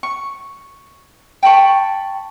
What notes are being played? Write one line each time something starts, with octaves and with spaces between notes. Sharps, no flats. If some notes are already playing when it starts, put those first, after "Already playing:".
C#6
G5 A5 B5 C#6